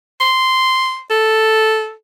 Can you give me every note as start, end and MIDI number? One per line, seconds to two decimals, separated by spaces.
0.20 1.01 84
1.10 1.92 69